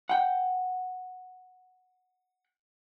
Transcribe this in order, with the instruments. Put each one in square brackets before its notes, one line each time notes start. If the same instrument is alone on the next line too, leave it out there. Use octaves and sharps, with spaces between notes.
[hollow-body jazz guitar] F#5 G5